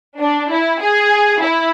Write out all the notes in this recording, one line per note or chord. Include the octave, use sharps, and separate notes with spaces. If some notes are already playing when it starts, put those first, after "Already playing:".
D4
E4
G#4
E4